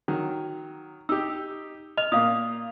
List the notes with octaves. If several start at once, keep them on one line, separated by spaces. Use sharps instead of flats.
D#3 F#3
D#4 G4 E6
D#5 F6 F7
A#2 A#3 F5 D#6